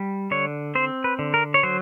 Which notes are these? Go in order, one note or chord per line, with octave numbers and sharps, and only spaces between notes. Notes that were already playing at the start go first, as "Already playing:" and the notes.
Already playing: G3
D3 C#5
C4 C5
B4
D3
A#4
C#5
F#3 C5